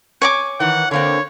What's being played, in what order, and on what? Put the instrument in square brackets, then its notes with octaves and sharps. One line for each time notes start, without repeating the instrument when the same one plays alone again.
[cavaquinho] C#5 G#5 D6
[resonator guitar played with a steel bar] D#3 E3 [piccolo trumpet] F#5
[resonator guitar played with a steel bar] D3 A#3 C4 [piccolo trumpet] C#5